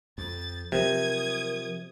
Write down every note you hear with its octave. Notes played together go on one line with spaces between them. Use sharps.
F2 A6
C3 F3 F#3 A#4 D#6 G#6